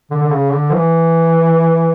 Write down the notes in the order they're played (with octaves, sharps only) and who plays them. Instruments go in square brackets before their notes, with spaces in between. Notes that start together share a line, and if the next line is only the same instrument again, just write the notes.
[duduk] D3
D3
C#3
D3
F3
E3